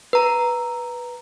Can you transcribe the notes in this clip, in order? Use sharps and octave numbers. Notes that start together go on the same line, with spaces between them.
B4 A#5